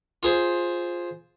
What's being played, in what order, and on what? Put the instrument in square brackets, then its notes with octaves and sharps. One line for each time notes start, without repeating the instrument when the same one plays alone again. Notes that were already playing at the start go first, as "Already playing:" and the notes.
[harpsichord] F4 G#4 C5